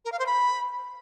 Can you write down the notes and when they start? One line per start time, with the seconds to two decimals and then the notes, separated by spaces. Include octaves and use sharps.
0.05 A#4
0.12 F5
0.19 C5
0.26 B5